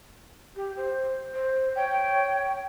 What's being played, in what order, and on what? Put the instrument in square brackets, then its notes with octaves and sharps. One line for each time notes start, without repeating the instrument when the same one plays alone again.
[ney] G4
C5
C5
[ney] C#5 [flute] G5